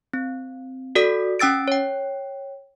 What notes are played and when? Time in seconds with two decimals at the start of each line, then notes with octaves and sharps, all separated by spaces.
0.13 C4
0.95 F#4 A4 D5 D#6 B6
1.39 C#4 G5 E6 A6 D7
1.68 C#5 G5